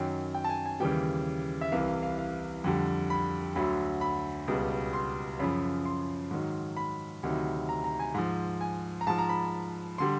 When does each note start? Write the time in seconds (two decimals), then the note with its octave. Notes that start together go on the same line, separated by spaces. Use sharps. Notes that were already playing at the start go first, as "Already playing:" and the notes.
Already playing: F#2 D#3 F#3 G5
0.35 G5
0.44 A5
0.49 G#5
0.66 G#5
0.80 D#2 C#3 E3 G3 G5
1.61 E5
1.72 C2 C3 E3 F5
1.88 F5
2.03 F5
2.18 F5
2.64 F2 D3 G3
3.10 B5
3.56 D2 D3 F#3 B5
4.01 B5
4.48 C#2 B2 G3
4.93 C6
5.39 F#2 C#3 F3 B5
5.85 C6
6.31 G#2 D#3 F#3
6.77 B5
7.23 D2 C3 D#3 F#3
7.69 A#5
7.84 A#5
7.99 G#5
8.14 G#2 F3
8.61 G#5
9.01 A#5
9.07 G#2 F3 A5
9.19 A#5
9.29 B5
9.98 D3 G3 C6